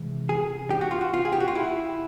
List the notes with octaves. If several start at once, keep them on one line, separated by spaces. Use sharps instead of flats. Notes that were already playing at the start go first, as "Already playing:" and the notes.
Already playing: C3 E3 G#3
G#4
G4
F#4
F4
F#4
F4
G#4
G4
F#4
F4
E4